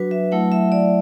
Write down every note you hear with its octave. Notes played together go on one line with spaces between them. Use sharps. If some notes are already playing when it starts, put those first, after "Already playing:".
Already playing: F#3 D4 F#4 B4
E5
F#3 A3 E4 F#5
E5
D5